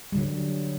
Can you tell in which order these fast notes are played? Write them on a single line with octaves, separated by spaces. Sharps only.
G3 D3 F#3